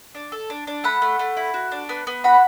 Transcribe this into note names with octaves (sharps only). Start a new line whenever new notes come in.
D4
A4
D4
D4
A3 F#5 B5
A3
A3
E4
F#4
D4
B3
B3
F#4 F#5 B5